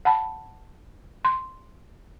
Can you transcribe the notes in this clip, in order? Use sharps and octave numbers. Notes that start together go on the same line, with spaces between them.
F#5 A5 B5
C6